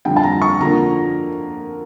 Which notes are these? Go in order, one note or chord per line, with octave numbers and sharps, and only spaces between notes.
F2 D3 G3 G5
A5
A#5
C#6
D3 F3 A#3 A#5